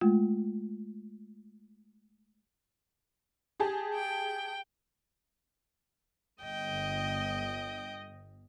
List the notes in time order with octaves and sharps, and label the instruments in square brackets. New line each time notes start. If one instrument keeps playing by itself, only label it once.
[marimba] G#3 A3 F4
[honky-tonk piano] G4 G#4 A5
[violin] G5
[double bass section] G1 [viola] D#5 [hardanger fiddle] G5